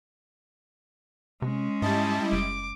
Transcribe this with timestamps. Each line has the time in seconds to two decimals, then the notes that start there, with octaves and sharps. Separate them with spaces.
1.42 C3 G#3 C#4
1.82 G#2 G3 E4 D#5 A5
2.32 F#1 D6